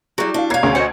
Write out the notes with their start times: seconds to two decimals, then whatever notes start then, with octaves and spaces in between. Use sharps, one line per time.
0.18 F#3 G3 E4 F#4 G#4
0.34 D4 D#5 F5
0.50 B2 C#5 F5 A#5 G#6 C7
0.63 D2 C#4 G#4 C5 C#6
0.75 F#4 C5 C#5 D#5 F#5